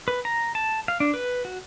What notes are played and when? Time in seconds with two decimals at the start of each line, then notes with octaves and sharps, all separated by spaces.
0.08 B4
0.25 A#5
0.55 A5
0.88 F5
1.00 D4
1.14 B4
1.45 F#4